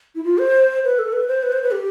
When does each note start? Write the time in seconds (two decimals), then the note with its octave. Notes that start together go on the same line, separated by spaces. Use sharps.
0.15 E4
0.24 F4
0.39 C5
0.84 B4
0.99 A4
1.13 B4
1.28 C5
1.43 B4
1.52 C5
1.63 B4
1.72 G4